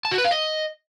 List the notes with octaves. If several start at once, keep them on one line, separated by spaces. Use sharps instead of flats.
A5
F#4
B4
F5
D#5